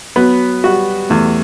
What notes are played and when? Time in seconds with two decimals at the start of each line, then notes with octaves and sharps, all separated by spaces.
0.16 F#3 B3
0.64 G3 F#4
1.10 E2 A3